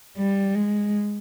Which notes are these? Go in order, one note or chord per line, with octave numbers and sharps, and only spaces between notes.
G3
G#3